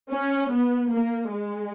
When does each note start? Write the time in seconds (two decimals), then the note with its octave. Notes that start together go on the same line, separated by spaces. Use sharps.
0.12 C#4
0.52 B3
0.92 A#3
1.33 G#3